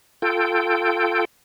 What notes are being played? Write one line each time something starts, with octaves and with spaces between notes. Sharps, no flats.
F4 A4 G5